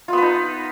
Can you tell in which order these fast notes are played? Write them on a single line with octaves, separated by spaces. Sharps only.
F4 B3 B4 D#4